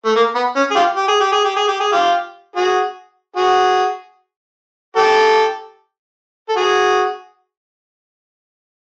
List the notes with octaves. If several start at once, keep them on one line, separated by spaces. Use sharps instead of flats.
A3
A#3
B3
C#4
G#4
F4 G4
G4
G#4
G4
G#4
G4
G#4
G4
G#4
F4 G4
F#4 G#4
F#4 G#4
G4 A4
A4
F#4 G#4